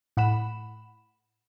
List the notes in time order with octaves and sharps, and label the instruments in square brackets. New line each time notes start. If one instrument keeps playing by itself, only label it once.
[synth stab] A2 F#5 B5 E7